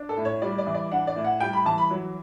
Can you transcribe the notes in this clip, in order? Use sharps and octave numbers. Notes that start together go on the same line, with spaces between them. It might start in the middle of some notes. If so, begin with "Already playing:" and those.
Already playing: D4
A4
A2
C#5
G3 D5
D5
E3
D5
D4 F#5
D5
A2
F#5
G3 G5
B5
E3 A5
B5
F#3